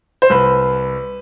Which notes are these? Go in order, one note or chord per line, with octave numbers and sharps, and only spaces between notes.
C5
C2 B4